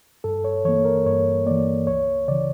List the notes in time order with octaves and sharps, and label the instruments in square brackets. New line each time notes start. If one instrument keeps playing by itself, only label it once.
[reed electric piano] G2 A4
C#5
E3 A#3 C#5
A#4
G2 C#5
E3 A#3 D5
C#2 C#5
C#3 E3 D5